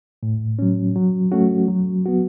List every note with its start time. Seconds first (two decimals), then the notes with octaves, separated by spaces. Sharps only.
0.23 A2
0.59 F#3 C#4
0.96 F#3
1.32 A3 C#4 F#4
1.68 F#3
2.06 B3 F#4